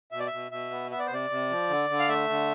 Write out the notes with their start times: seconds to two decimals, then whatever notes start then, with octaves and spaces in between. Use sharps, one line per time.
0.11 B2 E5
0.20 D5
0.27 E5
0.32 B2
0.51 B2 E5
0.71 B3
0.90 B3 E5
0.99 D5
1.07 C5
1.10 C3 D5
1.30 C3
1.50 F3
1.69 D3
1.90 D3
1.99 F5
2.08 A3 E5
2.29 D3